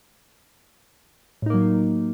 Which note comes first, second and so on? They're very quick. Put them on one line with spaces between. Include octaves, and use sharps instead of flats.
A2 D#4 A#3 F#3